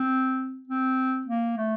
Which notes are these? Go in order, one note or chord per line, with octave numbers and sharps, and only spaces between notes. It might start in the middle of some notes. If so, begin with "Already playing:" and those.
Already playing: C4
C4
A#3
A3